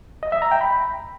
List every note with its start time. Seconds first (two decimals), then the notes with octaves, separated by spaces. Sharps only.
0.23 D#5
0.32 E5
0.42 A#5
0.51 G5
0.61 B5